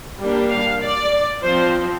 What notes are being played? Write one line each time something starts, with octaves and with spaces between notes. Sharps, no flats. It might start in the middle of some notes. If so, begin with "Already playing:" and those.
G3 A#3 D4
F5
D5
F3 C4 C5